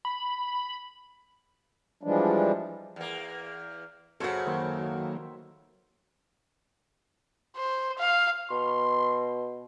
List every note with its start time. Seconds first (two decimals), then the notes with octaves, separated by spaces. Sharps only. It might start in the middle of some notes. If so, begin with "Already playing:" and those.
0.05 B5
2.03 E3 F3 G3 G#3 D4
2.96 E2 A#3
4.20 F#2 C#3 A4 C5 C#5 E5 F#5
4.47 D#3 F#3 A#3 C5 E5 G5
7.56 C5
7.98 F5
8.50 B2 C6